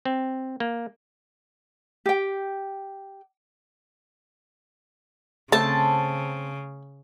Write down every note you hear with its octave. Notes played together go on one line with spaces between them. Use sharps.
C4
A#3
G4 G5
C#3 A3 C4 A5